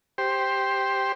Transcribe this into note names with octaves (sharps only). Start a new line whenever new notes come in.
G4 C5